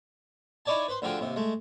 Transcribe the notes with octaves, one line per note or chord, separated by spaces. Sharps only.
D#4 E4 C#5 D5 G#5 A5
B4 C5 C6
D2 D3 F3 F#4 G#4 G5
D#2 C3
G#3 A3